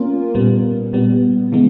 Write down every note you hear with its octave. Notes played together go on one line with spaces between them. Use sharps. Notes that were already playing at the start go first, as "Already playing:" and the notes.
Already playing: A#3 C#4 F4 A#4
A#2 G3 B3
A#2 G3 B3
C#3 E3 G#3 B3